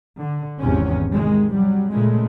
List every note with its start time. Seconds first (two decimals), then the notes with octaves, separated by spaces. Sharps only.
0.19 D3
0.60 G#1 E2 G#2 C3 C#4
1.12 C3 D#3 G#3
1.55 F#3 G3
1.91 A#2 C#3 G#3 A3